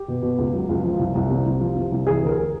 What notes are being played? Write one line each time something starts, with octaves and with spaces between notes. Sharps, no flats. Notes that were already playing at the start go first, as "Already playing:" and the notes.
Already playing: G4
B2
B2
C#2
F#3
C#2
F3
C2
C2
C3
C2
F3
C3
C2
E3 G#4
D2 A#4